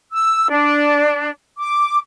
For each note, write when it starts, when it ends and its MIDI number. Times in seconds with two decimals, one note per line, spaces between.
0.13 0.51 88
0.51 1.30 62
1.58 1.98 86